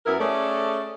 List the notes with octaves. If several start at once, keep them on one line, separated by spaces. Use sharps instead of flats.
F#2 B3 E4 A#4
A3 C#4 G#4 A4 D5